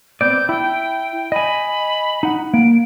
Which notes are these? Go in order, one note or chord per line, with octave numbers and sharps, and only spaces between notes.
B3 C4 D5 G6
E4 G5
D#5 G#5 B5
D#4 F#5
A#3 D7